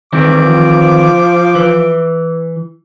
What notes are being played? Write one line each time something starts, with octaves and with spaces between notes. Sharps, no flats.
D#3 E3 C4 D6
F3
E3